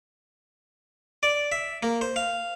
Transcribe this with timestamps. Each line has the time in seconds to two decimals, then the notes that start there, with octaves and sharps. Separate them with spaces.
1.23 D5
1.52 E5
1.83 A#3
2.01 C5
2.16 F5